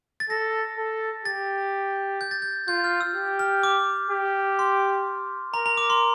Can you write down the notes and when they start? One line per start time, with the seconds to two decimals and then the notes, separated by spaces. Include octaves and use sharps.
0.20 A6
0.30 A4 A#6
0.78 A4
1.25 G4 A6
2.21 G6
2.31 A6
2.42 G6
2.68 F4 G6
2.84 F6
3.01 E6
3.15 G4
3.39 F6
3.63 D6
4.11 G4
4.59 C6
5.54 A#4 A#5
5.66 A#5
5.77 D6
5.90 C6